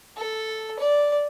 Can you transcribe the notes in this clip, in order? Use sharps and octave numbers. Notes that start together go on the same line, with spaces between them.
A4
D5